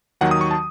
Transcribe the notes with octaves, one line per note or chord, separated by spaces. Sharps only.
D#2 D#3 F#3 F#5
D#6
C#6
A5